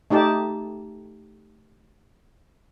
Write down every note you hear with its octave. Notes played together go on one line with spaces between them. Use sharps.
A3 D#4 G4 D5 A5